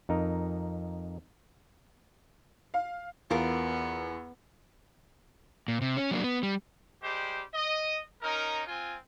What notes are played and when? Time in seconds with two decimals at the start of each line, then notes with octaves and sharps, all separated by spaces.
0.09 F2 D#4 A#4
2.74 F5
3.30 E2 B3 F4 A#4
5.68 A#2
5.82 C3
5.97 C#4
6.11 F#3 A#3 D4
6.24 B3
6.43 G3
7.02 G3 G#3 G4 C5
7.54 D#5
8.23 C#4 D#4 A#4
8.67 C4 F4 G#5